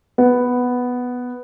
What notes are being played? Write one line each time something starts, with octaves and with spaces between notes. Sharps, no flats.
B3